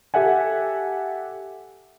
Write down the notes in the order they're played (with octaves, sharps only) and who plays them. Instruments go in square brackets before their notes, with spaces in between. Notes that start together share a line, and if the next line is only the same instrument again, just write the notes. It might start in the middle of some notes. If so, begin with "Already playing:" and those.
[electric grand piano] G4 A4 E5 F#5 G#5